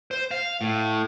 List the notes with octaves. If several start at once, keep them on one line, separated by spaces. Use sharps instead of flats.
C5
F5
A2